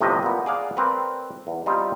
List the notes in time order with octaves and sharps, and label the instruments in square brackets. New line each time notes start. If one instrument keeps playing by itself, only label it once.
[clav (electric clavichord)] G1 A2 C3 F3 G4 D#5
A#2 B3
G#4 D5 F5 F#5
C4 A#4 B4 D5
E2
G3 C4 D#4 F4 G4